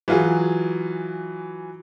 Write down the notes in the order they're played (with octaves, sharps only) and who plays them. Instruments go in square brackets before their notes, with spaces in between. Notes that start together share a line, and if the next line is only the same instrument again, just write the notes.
[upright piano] E3 F#3 F4 F#4 G#4